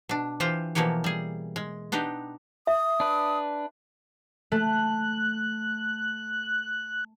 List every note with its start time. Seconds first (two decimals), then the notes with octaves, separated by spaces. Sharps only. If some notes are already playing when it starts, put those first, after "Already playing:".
0.09 B2 D4
0.40 E3 F4 G4 C5 G5
0.75 B2 E3 F3 A#3 G4 C#5
1.04 G3 G#4
1.56 G#3
1.92 B3 D4 D#4 G4
2.67 E5 D#6
3.00 D4 B4
4.52 A3 F#6